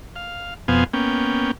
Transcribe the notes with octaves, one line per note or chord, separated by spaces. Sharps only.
F5
F2 B2 B3 C5 F5 G#5
A#3 B3 C#4 G5